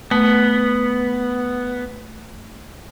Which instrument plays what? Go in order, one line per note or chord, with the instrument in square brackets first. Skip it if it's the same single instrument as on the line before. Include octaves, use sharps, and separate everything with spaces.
[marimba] A3 [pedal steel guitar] B3